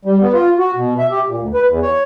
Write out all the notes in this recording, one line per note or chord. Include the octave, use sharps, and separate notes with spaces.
G3
B3
F4
F#4
B2
E5
G4
A#2
D2
B4
E2
C#5